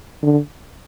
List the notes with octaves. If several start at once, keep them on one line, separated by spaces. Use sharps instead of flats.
D3